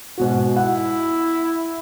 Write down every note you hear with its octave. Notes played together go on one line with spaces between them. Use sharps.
G#2 B2 F#4
E4 F#5